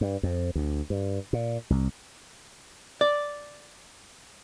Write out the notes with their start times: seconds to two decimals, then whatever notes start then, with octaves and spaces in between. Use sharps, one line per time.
0.01 G2
0.23 F2
0.55 D2
0.90 G2
1.33 A#2
1.70 C2
3.01 D5